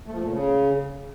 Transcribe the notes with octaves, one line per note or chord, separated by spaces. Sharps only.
A3
F3
A3
A#2
C#3